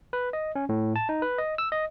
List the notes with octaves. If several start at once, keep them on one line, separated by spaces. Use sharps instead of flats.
B4
D#5
C#4
A2
A5
D#4
B4
D#5
E6
D#5